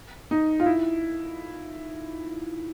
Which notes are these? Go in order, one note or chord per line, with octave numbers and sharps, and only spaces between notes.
D#4
F4
E4